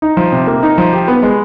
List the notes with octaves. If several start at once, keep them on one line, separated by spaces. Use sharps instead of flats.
D#4
F3
C3
A#3
D#4
F3
G4
B3
G#3